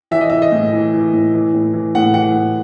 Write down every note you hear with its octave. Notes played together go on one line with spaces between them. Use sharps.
E3 E5
D#5
E3 E5
D#5
A2
E3
E3
A2
E3
A2
E3
A2 F#5
E3 F#5
A2